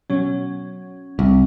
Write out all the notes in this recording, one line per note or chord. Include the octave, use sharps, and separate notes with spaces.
B2 F#3 C#4
C2